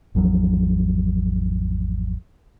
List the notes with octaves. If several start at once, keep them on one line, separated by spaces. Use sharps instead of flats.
G#1 E2 F3 F#3